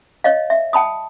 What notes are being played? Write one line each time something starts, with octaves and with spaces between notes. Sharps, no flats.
C#5 D#5 F5
E5
G5 A5 B5 D#6